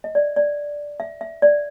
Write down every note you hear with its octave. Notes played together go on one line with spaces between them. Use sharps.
D#5
D5
D5
E5
E5
D5